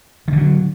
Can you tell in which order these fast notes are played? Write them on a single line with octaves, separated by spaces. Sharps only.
D#3 D3 F#3